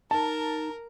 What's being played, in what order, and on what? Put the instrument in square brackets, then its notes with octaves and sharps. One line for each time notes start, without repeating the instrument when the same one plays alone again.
[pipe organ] D#4 [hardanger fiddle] A#4 [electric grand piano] A5